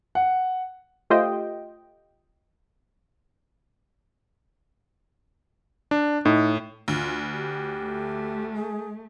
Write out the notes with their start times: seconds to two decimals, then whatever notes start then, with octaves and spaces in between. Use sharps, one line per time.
0.15 F#5
1.10 A3 F4 G4 C5 D#5 G5
5.91 D4
6.25 A2 D#4
6.88 D2 F4
7.32 G4
7.84 A3
8.54 G#4